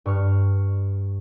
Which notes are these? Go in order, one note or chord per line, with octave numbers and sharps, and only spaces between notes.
G2 C#6 F6